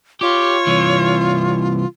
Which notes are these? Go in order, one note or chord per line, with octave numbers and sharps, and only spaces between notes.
F4 G4 C#5
C2 E3